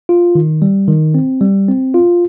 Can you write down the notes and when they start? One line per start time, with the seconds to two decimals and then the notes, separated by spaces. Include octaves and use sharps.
0.09 F4
0.35 D#3
0.62 G3
0.88 D#3
1.14 C4
1.41 G3
1.68 C4
1.94 F4